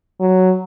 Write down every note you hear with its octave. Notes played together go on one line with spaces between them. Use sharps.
F#3